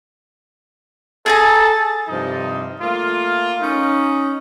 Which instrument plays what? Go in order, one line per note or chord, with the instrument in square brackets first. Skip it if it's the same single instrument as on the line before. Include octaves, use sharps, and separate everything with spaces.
[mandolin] G#4 G#5 A#5 [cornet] A4 [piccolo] A6
[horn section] G2 C3 F3 D#4
A3 A#3 F4
C#4 D#4